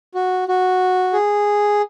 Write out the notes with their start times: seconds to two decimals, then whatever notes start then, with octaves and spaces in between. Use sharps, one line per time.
0.15 F#4
0.48 F#4
1.13 G#4